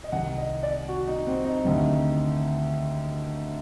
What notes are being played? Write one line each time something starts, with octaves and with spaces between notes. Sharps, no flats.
D#5
C2 C3 D#3 F#5
D#5
D5
F#4
D#4
C4
D#4
D2 C3 D#3